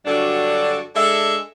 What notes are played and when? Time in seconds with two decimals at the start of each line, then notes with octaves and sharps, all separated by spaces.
0.06 G2 D3 F#3 D4 F#4
0.95 G#3 D4 A4 E5